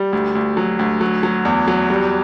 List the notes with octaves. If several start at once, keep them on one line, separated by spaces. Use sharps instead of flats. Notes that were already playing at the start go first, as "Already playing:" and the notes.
Already playing: G3
D2
D2
F#3
D2
F#3
F#3
E2
F#3
G3